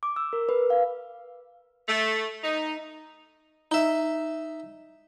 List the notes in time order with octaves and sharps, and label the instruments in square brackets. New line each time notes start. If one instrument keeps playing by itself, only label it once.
[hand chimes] D6
E6
A#4
B4
F5
[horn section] A3
D#4
[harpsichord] D#4 E5